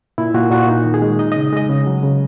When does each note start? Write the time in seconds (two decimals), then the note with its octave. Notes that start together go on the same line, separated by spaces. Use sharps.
0.18 A#2 E4
0.34 A#2 F#4
0.51 A#2 F#4
0.68 D#4
0.85 D#3
0.94 G#4
1.02 G#3
1.19 D#4 D#5
1.32 C#3 D#5
1.53 G#3 D#5
1.70 C#3
1.86 F#3
2.03 C#3